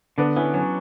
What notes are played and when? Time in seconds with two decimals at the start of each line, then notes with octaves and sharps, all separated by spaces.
0.18 D3 B3 D4
0.36 B3 C#4 E4
0.54 F#3 C#4